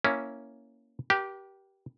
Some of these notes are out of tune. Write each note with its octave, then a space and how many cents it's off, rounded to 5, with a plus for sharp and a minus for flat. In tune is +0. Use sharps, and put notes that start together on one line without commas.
A#3 +0 C#4 +0 E4 -10
G4 -15 A#4 +45